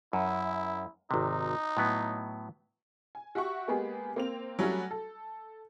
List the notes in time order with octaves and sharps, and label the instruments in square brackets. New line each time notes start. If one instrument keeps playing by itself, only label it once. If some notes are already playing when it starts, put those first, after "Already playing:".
[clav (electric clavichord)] F#2 [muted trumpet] E4
[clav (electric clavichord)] G#1 C3 [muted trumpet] D#4
[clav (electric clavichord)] A2 F#3 B3
[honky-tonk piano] G#5
F#4 G4 E5 F#5 C#6
G#3 A#3 B3 G4 G#4
A#3 C4 F7
F#3 G3 A3 C#4 F#4
A4